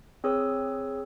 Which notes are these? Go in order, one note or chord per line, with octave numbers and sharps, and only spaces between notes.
C4 G#4 B4 C#5 D#6 E6